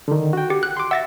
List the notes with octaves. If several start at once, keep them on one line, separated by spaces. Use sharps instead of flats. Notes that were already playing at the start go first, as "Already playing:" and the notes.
D3 D#3
F#4 G5
G4
F#6
C6 D6
E5 F#5 A6 A#6